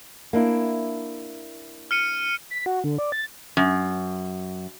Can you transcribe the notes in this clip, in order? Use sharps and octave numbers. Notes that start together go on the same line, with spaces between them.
A#3 D4 E4
F6 C#7 D#7
B6
F#4
D3
D5
A6
F#2